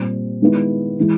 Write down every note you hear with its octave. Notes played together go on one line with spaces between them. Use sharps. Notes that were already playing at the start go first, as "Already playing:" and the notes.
Already playing: A#2 G3 C4
D#3 G#3 B3 E4
E3 G#3